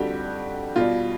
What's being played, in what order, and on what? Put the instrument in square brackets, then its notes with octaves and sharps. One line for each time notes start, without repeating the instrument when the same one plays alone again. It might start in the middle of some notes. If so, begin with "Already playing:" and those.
Already playing: [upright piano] F2 D3 G3 F#4 G4
B2 G3 F4